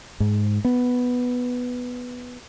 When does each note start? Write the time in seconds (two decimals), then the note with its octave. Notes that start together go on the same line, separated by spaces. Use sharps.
0.20 G#2
0.65 B3